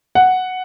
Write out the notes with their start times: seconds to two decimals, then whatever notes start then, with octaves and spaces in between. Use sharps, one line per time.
0.15 F#5